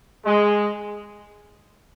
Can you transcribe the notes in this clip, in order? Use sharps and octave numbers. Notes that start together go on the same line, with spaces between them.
G#3